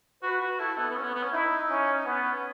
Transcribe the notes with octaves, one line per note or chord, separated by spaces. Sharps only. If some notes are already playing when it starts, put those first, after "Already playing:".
F#4 B4
F#4
E4 A4
B3
B3
C#4
B3
B3
C#4
D#4 E4
C#4
B3 C#4